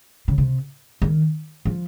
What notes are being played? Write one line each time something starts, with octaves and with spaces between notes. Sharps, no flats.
C#3
C3
D#3
F3